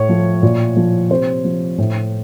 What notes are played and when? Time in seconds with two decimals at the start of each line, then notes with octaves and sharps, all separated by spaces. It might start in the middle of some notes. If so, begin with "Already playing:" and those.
Already playing: A2 C#5
0.09 F3
0.43 A#2
0.76 F3
1.11 C3 C5
1.44 F3
1.78 A2